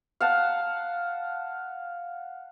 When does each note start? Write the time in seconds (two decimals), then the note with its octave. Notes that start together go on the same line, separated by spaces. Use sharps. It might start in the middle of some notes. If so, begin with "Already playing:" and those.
0.21 F5 F#5 A5